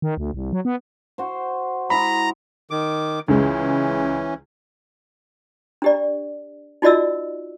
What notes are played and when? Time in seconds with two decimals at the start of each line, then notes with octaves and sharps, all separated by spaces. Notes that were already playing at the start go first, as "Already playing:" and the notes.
0.02 D#3
0.17 D2
0.34 C2
0.53 F#3
0.65 B3
1.18 F#4 C5
1.90 G#3 E4 D#5 A#5 B5
2.71 D#3 D6
3.28 C#2 C#3 E3 G#3 C#4
5.82 D4 G4 D5
6.82 D#4 F4 F#4 D5 D#5 E6